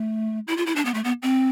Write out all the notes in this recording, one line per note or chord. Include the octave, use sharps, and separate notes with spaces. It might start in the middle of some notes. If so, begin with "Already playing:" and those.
Already playing: A3
E4
F4
E4
D4
B3
A3
B3
C4